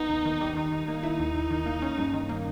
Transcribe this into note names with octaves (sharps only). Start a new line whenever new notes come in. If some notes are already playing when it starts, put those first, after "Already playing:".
Already playing: B3 D#4
D#2
D#3
G3
D#3 D#4
D#3
A#3
E4
D#2
D#2
D#3
A#3
C#4
G2
D#3
A#3